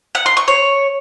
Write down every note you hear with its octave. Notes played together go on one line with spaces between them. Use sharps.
F#5
C6
C#6
C#5